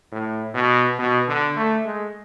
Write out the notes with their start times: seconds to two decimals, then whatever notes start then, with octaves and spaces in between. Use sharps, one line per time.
0.12 A2
0.54 B2
0.99 B2
1.28 D3
1.56 A3
1.85 G#3